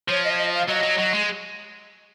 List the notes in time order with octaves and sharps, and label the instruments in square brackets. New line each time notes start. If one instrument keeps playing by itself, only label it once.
[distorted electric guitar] F3 [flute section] C#5
[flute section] D#5
C#5
D#5
F5
[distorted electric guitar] F#3 [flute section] D#5
[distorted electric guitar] F#3
F#3
G#3